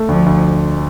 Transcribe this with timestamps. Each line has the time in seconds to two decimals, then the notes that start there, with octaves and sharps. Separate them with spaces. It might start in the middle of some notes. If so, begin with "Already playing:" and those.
Already playing: A3
0.08 D2 F3
0.26 D2